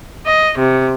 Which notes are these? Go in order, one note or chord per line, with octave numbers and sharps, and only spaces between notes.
D#5
C3